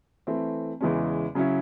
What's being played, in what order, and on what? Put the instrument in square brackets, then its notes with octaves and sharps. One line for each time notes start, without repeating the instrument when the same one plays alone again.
[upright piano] E3 A3 C4
E2 C#3 E3 G#3 C#4
C#3 F#3 C#4 E4